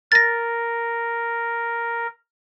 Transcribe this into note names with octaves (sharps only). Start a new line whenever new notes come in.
A#4 A6 A#6